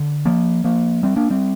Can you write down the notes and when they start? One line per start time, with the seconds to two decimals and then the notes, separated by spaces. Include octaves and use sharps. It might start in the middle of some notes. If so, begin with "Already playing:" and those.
Already playing: D3
0.25 F3 A#3
0.64 F3 A#3
1.03 G3 C4
1.16 A#3 D4
1.30 G3 C4